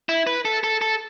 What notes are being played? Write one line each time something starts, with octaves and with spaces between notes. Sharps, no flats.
E4
B4
A4
A4
A4